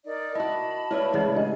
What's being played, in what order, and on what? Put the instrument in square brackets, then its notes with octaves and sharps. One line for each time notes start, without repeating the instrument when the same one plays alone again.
[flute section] D#4 A#4 D5
[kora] E4 F#4 [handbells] D#5 [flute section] A5 B5
[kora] A#3 B4 E5 [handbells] E4 C#5 D5
[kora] A2 C#3 [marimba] E3 G#3
[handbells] D4 [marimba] G4 D#5 [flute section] G#5